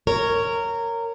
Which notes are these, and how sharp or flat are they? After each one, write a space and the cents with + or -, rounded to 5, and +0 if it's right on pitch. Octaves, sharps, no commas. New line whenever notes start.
A#4 -15 C#5 +0